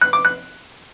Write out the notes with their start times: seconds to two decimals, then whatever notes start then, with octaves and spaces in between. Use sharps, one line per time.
0.01 F#6
0.13 D6
0.25 F#6